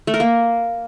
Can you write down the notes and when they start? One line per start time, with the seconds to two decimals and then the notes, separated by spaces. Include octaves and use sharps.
0.07 A3
0.14 A#4
0.20 A#3